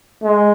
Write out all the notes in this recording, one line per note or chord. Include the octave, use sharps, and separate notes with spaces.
G#3